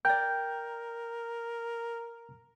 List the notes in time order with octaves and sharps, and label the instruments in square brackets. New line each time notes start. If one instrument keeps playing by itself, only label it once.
[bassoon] A#4 [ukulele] D5 G5 [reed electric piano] G6